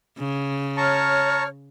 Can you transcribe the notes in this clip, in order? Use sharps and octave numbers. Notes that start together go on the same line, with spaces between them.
C#3
C#5 A5 A#5 C#6 F6